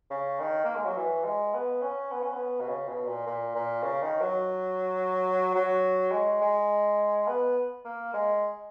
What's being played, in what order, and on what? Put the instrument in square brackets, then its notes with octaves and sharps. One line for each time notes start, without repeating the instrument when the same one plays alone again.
[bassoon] C#3
D#3
A#3
G#3
F#3
E3
G#3
B3
C#4
B3
C#4
B3
B2
C#3
B2
A#2
A#2
A#2
C#3
D#3
F#3
F#3
G#3
G#3
B3
A#3
G#3